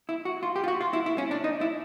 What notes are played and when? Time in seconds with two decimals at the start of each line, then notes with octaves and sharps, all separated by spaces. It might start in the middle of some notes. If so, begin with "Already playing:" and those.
0.09 E4
0.25 F#4
0.43 F4
0.56 G4
0.64 F4
0.68 F#4
0.81 F4
0.93 E4
1.06 E4
1.18 C#4
1.31 D4
1.44 D#4
1.61 E4